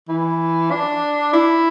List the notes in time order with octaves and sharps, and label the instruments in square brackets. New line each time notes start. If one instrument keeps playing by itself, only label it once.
[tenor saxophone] E3
D4
E4